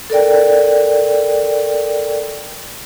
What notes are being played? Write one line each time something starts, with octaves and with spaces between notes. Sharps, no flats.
A4 A#4 D5 G5